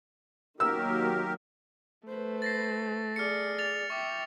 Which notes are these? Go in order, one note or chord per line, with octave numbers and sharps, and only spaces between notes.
D#3 F#3 A#3 G4 A#4 E6
A3 B4 C5
A6 A#6 C7
G#4 D5 F6 C#7
A6 F7
E5 G5 C#6 D6